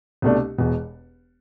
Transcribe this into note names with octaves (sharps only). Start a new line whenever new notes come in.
C2 B2 A3 D4
E1 E2 B2